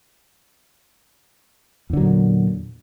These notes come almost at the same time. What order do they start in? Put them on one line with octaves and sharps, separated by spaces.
E2 D3 F#3 A#2